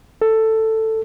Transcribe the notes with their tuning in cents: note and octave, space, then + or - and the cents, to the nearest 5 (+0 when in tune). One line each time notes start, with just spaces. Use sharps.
A4 +10